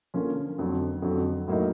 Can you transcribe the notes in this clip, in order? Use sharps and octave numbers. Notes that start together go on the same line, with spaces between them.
D3 F3 A#3 C#4
F2 D3 F#3
F2 D3 F#3
A2 F#3 A#3 D#4